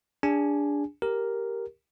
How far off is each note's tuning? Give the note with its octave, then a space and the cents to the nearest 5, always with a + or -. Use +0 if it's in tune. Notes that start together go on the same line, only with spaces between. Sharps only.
D4 -15 G#4 -35 G#5 +0
G4 +0 A#4 +0